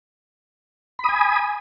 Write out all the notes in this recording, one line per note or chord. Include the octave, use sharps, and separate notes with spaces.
G#5 B5 D#6